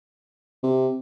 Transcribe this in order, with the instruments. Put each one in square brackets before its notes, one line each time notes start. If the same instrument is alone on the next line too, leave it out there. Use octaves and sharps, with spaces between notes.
[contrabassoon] C3